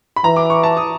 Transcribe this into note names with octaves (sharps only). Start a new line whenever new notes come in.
B5
E3 A#5
D6
C#6
A5
D#6